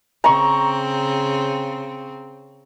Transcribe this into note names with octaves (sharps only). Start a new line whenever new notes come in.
C#3 C4 A#5 C#6